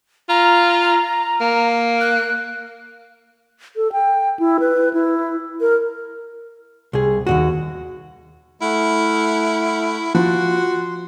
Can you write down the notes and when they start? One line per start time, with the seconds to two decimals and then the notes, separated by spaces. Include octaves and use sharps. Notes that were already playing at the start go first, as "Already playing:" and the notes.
0.29 F4 A#5
1.41 A#3
2.01 F#6
3.76 A4
3.92 G5
4.39 E4
4.60 B4
4.94 E4
5.61 A#4
6.93 C2 G#4
7.27 D#2 G#2 F#4
8.61 A3 E4 F#5 F6
10.15 F3 F#4 C6